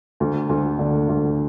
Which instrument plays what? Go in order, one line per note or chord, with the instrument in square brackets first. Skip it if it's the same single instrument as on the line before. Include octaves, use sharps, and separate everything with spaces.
[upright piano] D2
D2
D3
D2